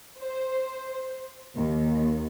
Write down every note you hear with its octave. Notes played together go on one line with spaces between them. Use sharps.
C5
D#2